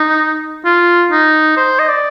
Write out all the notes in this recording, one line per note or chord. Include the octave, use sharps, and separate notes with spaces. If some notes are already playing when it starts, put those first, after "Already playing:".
Already playing: D#4
F4
D#4
C5
D#5
D5